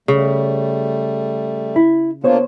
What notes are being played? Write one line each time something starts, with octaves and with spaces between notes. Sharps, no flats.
C#3 G3 A3
E4
A#3 B3 D4 F4 C5 C#5